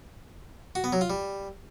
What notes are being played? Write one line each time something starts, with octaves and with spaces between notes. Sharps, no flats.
F#4
B3
F#3
F4
G3